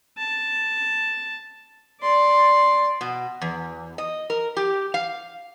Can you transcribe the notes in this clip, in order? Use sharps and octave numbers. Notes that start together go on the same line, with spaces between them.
A5
D5 C6
B2
E2
D#5
A#4
G4
F5